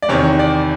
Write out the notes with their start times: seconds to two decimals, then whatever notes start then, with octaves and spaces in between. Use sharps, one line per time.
0.02 D5
0.09 E2 C3 D#3 C#5
0.39 D5